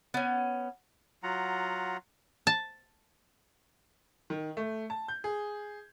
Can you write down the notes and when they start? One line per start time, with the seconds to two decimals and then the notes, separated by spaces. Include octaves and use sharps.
0.14 B3 C#4
1.23 F#3 F4 F#5 A#5
2.47 A5
4.30 D#3
4.57 A3
4.90 A5
5.08 G6
5.24 G#4